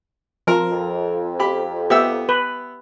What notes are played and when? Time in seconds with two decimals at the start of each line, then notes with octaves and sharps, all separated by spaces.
0.47 F3 C4 A#4
0.70 F2
1.39 G4 B5
1.90 B3 G4 E5 E6
2.29 B4